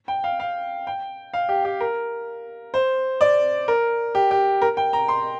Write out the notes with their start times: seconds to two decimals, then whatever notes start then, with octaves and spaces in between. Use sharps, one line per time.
0.08 G5
0.24 F5
0.40 F5
0.87 G5
1.33 F5
1.49 G4
1.65 G4
1.80 A#4
2.74 C5
3.21 D5
3.68 A#4
4.15 G4
4.31 G4
4.62 A#4
4.77 G5
4.93 A#5
5.09 C6